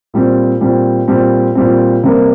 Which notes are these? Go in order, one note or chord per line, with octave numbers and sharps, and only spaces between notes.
A#2 G3 C4
A#2 G3 C4
A#2 G3 C4
A#2 G3 C4
C3 G3 A#3